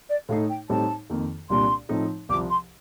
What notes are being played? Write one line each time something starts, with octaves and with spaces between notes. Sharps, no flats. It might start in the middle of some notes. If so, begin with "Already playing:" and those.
D5
A2 A3 D#4 F5
G5
A2 G3 C4 D#4 A5
F2 D#3 A#3
C2 A#2 G3 A#3 D4 C6
A2 F3 A3 C4 D#4
C2 C3 F3 D6
C6